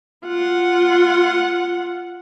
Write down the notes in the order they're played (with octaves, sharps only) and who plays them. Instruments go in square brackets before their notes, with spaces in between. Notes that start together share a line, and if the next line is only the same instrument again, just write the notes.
[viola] F4 F#5